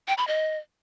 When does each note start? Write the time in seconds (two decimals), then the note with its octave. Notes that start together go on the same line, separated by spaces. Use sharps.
0.08 G5
0.18 B5
0.27 D#5